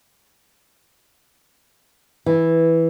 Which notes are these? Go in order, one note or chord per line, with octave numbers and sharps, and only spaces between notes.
E3